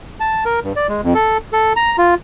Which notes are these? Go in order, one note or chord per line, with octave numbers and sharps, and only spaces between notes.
A5
A#4
G2
D5
G#3
F2
A4
A4
A#5
F4